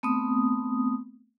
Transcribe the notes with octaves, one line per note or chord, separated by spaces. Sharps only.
A3 B3 C4 D#6